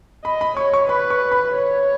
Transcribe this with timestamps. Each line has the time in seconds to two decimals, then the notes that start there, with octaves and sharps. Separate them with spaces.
0.25 D#5 B5
0.41 B5
0.57 C#5 C#6
0.74 C#6
0.89 B4 B5
1.10 C#6
1.32 B5
1.53 C#5